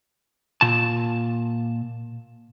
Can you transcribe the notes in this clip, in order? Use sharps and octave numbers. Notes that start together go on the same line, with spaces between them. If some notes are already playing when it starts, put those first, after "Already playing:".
A#2 A5